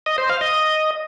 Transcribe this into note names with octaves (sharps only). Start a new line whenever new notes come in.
D#5
C5
F5
D#5